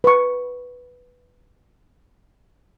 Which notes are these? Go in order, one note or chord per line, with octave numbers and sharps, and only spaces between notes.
B4 C#6